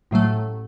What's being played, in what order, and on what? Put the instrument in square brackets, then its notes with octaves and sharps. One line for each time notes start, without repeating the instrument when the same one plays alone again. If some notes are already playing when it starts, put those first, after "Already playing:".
[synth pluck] A1 A2 F#3 A3